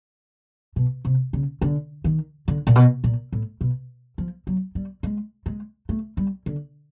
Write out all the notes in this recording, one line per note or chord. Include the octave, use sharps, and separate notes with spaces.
B2
C3
C#3
D3
D#3
D3
A#2
B2
A#2
A2
B2
F3
F#3
G3
G#3
G#3
A3
G3
D3